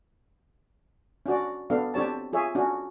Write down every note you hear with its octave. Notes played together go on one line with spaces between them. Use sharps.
C#4 D4 F#4 D5
B3 D4 A4 F5
C4 D4 G4 C#5 A5
F4 G#4 C#5 E5
C#4 D4 F#4